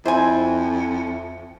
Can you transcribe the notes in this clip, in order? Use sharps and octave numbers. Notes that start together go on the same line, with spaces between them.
F2 E4 C5 G#5